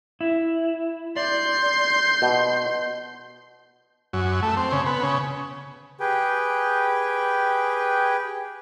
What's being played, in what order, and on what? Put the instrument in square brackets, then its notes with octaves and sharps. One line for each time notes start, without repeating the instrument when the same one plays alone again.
[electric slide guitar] E4
[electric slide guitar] D5 [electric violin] C6 G6
[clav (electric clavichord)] B2
[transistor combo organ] F#2
A3
C4
C#3
B3
C#3
[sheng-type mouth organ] G4 G#4 B4 G5